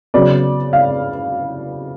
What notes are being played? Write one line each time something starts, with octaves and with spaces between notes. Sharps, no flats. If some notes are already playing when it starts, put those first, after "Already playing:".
C#3 F#3 B3 D5
F5